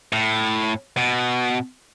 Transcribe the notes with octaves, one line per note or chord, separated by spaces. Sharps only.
A2
B2